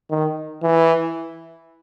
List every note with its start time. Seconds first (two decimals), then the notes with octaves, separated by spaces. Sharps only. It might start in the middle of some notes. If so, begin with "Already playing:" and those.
0.10 D#3
0.62 E3